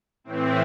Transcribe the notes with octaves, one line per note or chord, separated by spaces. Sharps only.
A2 E3 C4